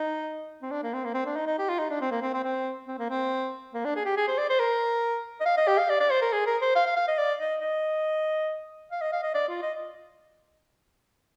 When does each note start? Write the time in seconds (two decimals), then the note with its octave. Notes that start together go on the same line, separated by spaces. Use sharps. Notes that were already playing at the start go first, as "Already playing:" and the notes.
Already playing: D#4
0.62 C4
0.71 D4
0.83 A#3
0.94 C4
1.05 A#3
1.14 C4
1.26 D4
1.36 D#4
1.47 D#4
1.59 G4
1.69 F4
1.79 D#4
1.90 D4
2.01 C4
2.11 A#3
2.22 C4
2.34 C4
2.44 C4
2.87 C4
2.99 A#3
3.10 C4
3.74 A#3
3.85 D4
3.96 G#4
4.05 G4
4.17 G#4
4.28 C5
4.38 D5
4.50 C5
4.59 A#4
5.41 D#5
5.46 F5
5.57 D#5
5.67 G4
5.78 F5
5.90 D5
6.00 D5
6.10 C5
6.22 A#4
6.33 G#4
6.47 A#4
6.62 C5
6.75 F5
6.86 F5
6.96 F5
7.08 D#5
7.18 D5
7.40 D#5
7.61 D#5
8.92 F5
9.01 D#5
9.13 F5
9.23 D#5
9.34 D5
9.49 F4
9.62 D#5